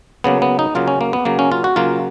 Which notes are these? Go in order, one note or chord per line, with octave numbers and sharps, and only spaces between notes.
C#3 F#3 A#3 B3
B3
D#4
C#3 F#3 A#3 F4
C#4
A#3
B3
C#3 F#3 A#3
C#4
F4
F#4
C#3 F#3 A#3 F4